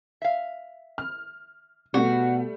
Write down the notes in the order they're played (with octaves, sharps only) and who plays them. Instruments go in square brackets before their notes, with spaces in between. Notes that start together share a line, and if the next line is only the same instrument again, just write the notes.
[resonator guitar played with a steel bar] E5 F5
[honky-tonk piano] F6
[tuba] B2 [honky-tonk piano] G3 A3 [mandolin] F#4